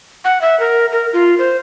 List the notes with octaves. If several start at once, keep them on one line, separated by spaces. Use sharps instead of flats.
F#5
E5
A#4
A#4
F4
C5